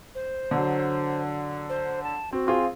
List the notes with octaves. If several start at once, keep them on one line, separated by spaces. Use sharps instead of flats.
C5
D3 F#3
C5
A5
C4 F#4
C4 F4 G#4